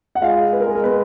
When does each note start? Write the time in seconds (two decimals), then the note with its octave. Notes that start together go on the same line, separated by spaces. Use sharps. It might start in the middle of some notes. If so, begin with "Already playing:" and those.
0.15 F#5
0.22 G#3 F4 F5
0.53 B4
0.60 A#4
0.68 G#3 G#4
0.75 A#4
0.83 B3 B4